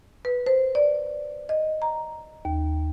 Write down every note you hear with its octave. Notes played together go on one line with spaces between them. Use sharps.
B4
C5
D5
D#5
A#5
D#2